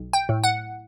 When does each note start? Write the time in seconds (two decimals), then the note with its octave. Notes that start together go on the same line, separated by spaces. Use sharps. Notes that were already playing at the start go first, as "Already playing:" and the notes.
Already playing: B1
0.13 G5
0.29 A2
0.44 F#5